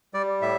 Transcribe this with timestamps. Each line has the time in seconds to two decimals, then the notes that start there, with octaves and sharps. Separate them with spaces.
0.14 G3 D5
0.41 A2 E5